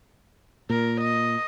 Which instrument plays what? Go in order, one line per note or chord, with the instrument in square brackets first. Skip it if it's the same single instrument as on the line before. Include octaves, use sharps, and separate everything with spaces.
[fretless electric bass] A#2 [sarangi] A#4
[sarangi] D#5